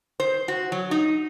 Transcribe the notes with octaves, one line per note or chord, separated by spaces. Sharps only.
C5
F#4
F#3
D#4